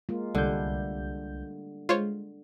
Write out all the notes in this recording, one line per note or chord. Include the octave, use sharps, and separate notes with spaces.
G#3 A#3 F4
C2 D3 G3 A3 D4 G6
G#3 F4 C5 C#5